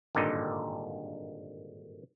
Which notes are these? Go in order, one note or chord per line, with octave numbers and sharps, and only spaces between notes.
G#1 G2 A#2 D3 D#4